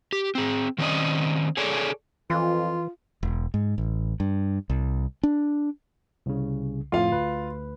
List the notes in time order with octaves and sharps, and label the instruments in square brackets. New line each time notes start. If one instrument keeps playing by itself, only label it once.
[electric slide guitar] G4
C4 G#4
D#3 F#3 C4 C#4 D5 D#5
G#4 A4 C#5 D5
[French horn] F2 [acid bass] E3 [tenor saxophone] F4
[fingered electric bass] E1
G#2
A1
G2
C2
D4
[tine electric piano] C2 C#3
[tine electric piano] F2 A2 [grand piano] F4 F5
[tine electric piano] D2 B4